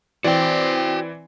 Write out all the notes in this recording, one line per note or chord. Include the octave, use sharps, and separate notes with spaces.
E3 C4 F#4 D5 G5